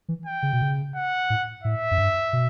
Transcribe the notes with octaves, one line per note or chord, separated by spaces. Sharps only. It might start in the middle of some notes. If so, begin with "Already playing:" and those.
E3
G5
C#3
B2
C#3
F#5
A2
A2 E5
F#2
G2
B2